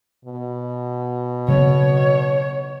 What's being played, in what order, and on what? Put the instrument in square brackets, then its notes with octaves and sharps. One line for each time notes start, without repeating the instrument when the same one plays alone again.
[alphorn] B2
[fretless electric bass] C#3 F#3 B3 [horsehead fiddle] C#5